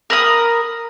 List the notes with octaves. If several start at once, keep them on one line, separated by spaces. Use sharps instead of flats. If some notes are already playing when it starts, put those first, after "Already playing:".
A#4 B5 D#6